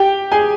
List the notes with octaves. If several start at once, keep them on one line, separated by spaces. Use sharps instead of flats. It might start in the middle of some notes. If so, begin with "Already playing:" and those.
Already playing: G4 G5
G#4 G#5